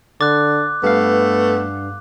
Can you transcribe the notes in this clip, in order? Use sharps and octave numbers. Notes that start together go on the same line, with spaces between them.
D3 D6 F#6 A6
G2 A3 B3 F5